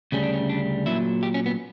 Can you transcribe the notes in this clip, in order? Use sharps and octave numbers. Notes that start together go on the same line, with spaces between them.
D2 C#3 G3 C#4
D4
C#4
D4
A#2 F#3 E4
G4
C#4
B3